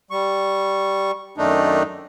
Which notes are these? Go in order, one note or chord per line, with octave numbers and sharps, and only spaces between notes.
G3 C#6
F#2 D#3 A3 D4 D#4